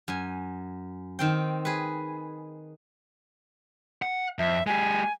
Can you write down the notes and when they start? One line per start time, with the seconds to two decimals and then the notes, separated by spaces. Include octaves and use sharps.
0.08 F#2 G#5
1.19 D#3 C4 G5
1.65 G#4 B4
4.02 F#5
4.39 F2 E5
4.67 G#3 G4 G#5